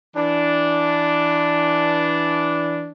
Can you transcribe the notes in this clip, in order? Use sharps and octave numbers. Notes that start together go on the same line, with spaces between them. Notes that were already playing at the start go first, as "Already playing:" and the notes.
E3 D4